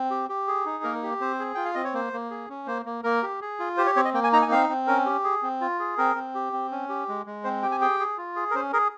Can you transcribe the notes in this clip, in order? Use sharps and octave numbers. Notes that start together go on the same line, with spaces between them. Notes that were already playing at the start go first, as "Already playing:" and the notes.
Already playing: C4
G4
G4
G#4
D#4
A#3 A#4
G4
C4 C5
G#4
F4 G5
F5
C4 D#5
C#5
A#3 C5
A#3
G#4
C#4
A#3 C5
A#3
A#3 A#4
G4
G#4
F4
G4 C5
C#5
C4 C#5
D#5
A#3 G5
G#5
D#4 A#5
G#5
C4 F5
C4
C#4 A#4
G4
G#4
C4
F4
G#4
C4 A#4
C4
G4
C4
C#4
G4
G#3
G#3
C4 C5
G4 G5
G#5
G#4 G5
G#4
F4
G#4
A#4
C#4 C5
G#4 A#4